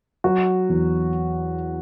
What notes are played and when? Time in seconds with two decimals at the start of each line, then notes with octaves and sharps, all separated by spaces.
0.24 F#3 F#4
0.69 E2